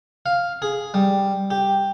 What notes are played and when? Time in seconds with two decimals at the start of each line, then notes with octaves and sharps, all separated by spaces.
0.26 F5
0.62 G#4
0.94 G3
1.50 G4